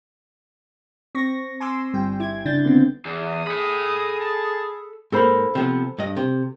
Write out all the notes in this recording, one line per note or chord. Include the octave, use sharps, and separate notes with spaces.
C4 C#6 A#6
G#5 C6 D6 E6
G1 G3 G5
E4 D6 G#6
C#3 D4 G6 A6
D3 B3 C4
E2 D#6
G#4 A4 B5
A5
G#2 A#3 A4 C5 B5
C3 F3 B3
G2 D#5
C3